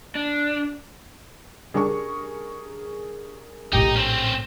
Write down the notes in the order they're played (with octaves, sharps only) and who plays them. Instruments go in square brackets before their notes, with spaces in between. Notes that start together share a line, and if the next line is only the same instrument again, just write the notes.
[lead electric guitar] D4
[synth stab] C#3 G3 D4 [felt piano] G#4 A#4 C#6
[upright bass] A#1 A2 [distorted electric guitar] D#4 [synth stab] G4 G5
[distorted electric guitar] C4 C#4